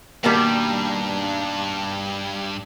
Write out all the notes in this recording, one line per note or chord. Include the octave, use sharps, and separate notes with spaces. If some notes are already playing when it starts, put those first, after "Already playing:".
G2 B2 D#3 G3 A#3 D4